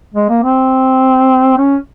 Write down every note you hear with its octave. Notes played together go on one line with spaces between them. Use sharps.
G#3
A#3
C4
C#4